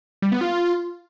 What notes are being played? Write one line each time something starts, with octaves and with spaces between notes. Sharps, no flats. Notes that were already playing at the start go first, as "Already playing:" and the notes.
G3
B3
F4